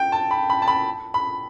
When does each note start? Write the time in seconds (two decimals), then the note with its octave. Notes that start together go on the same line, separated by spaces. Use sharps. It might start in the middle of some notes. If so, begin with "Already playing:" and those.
Already playing: G5
0.12 A5
0.31 B5
0.50 B5
0.62 A5
0.68 B5
1.14 B5